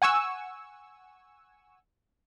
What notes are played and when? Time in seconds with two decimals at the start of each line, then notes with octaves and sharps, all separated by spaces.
0.02 F#5 G#5 C#6 E6